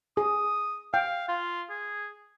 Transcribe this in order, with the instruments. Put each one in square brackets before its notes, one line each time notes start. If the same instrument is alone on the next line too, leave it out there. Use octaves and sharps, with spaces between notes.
[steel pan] G#4 [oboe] D#6
[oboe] F5 [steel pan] G5
[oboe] F4
G#4